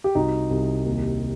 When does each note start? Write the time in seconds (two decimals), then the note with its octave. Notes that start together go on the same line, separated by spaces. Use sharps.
0.04 G4
0.15 C2 D#4 F#4
0.51 C2
0.86 D#2